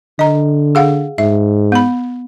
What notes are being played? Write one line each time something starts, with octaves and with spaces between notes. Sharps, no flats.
D3 D#5 A#5
G#4 F5 F#5
G#2 E5
B3 B5